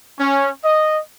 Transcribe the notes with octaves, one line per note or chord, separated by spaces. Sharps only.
C#4
D#5